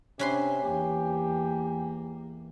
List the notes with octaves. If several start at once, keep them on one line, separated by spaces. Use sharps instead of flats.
C3 C#4 D4 B4 G#5 C6
E2 A#3 G4